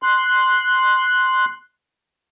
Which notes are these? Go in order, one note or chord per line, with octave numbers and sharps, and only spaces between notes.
C6 F#6